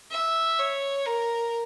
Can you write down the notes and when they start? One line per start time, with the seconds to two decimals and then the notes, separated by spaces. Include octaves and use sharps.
0.11 E5
0.59 C#5
1.06 A#4